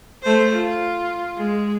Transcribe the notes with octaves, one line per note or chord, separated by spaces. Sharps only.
A3 C5
F4
G#3